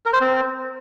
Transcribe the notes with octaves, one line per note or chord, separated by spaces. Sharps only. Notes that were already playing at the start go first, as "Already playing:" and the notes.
A#4
C5
C4